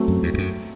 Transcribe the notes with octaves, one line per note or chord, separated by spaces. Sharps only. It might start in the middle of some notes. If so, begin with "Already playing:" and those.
Already playing: F#3 A3 C4
F#2
E2
E2
F#2